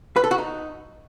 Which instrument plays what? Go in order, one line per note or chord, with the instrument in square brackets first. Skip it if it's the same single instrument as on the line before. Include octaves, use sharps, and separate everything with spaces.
[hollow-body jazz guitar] B4
A4
F#4
D#4